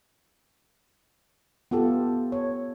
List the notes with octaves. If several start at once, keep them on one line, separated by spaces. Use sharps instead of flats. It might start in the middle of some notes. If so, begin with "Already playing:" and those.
B3 F4 G4 A4
C#5